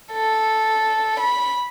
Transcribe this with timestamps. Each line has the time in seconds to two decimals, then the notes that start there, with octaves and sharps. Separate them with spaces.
0.12 A4
1.20 B5